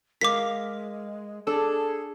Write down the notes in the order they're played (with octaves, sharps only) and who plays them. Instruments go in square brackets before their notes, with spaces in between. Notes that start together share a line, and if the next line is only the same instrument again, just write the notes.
[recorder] G#3 [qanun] A#4 F5 [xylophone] D6 B6
[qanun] D4 [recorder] G#4 [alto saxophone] A4